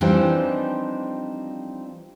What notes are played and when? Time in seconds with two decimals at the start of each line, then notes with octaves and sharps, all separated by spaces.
0.01 E3 F3 G3 C4 D4 D#4